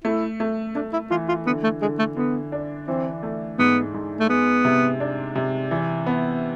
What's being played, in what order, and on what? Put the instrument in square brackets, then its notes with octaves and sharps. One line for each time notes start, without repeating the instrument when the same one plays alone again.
[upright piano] A3 [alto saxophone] E4
[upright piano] A3
[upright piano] A3 [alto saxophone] D4
[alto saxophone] E4
[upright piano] E3 [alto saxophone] F4
[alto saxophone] F4
[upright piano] D3 [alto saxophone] B3
[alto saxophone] A3
[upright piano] D3 [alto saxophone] G#3
[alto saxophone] A3
[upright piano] D3 [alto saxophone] B3
[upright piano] D4
[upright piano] E3 [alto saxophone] C4
[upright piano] A3
[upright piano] G#2 [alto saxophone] B3
[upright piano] G#2
[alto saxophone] A3
[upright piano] G#3 [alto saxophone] B3
[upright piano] C3
D4
C3
E3
B3